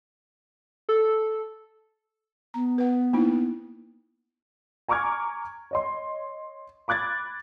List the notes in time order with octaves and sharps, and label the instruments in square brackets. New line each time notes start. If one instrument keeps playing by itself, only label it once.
[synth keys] A4
[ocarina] B3 [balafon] A#5
[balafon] B4 F#5
A#3 D#4 E4
[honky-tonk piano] G#5 A#5 C#6 D6 F6 G#6
C#5 D#5 C6
B5 D6 F#6 G#6 A6